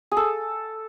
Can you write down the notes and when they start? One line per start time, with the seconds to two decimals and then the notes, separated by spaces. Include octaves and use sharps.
0.11 G#4
0.17 A4